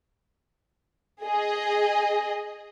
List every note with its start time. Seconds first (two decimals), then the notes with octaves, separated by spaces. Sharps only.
1.25 G#4 D#5